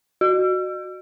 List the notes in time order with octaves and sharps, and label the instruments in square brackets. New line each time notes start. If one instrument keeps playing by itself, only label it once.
[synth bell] F#4